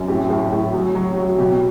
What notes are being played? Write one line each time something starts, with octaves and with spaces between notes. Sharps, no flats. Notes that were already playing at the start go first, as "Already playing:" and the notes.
Already playing: F#2
A2 G4
A2
A2
F#3
F#3
F#3
B2 G4